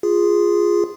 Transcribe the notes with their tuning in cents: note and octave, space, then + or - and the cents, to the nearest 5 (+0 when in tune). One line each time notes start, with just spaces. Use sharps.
F4 +0 G#4 -10